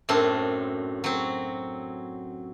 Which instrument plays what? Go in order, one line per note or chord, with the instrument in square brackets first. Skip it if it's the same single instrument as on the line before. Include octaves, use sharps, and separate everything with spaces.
[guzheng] F#2 A2 C4 D4 C6
F#3 C4